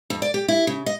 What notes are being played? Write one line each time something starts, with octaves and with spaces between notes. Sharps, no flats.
F2
D5
G4
E4
C#3
D#5